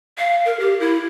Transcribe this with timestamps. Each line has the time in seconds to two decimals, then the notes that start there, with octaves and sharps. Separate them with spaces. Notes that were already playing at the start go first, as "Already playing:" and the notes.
0.18 F5
0.45 A#4
0.60 G4
0.80 E4